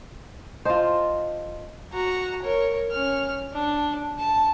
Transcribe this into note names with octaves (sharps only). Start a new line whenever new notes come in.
F4 C5 D#5 A5
F#4 A#5
A#4 C#5
C#4 F6
D4
A5